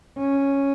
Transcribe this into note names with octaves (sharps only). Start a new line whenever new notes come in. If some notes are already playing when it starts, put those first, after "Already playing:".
C#4